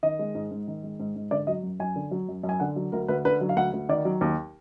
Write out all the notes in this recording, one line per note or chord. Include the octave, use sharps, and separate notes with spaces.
D#3 D#5
G#3
G#2
G#2
D#3
G#3
G#2
G#2
D3 D5
F#3 D#5
F#2
F#2 G#5
D3
F#3
F#2
F#2
G#5
D3 F#5
F#3
D2 A#4
D2 B4
D3 B4
F#3
F5
D2 F#5
D2
D#3 D5
F#3
D#2